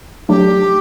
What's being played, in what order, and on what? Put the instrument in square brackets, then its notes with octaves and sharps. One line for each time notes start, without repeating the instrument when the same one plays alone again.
[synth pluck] F#3 A3 D4 [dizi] G4